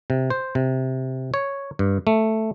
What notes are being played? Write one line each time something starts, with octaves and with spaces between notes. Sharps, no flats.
C3
C5
C3
C#5
G2
A3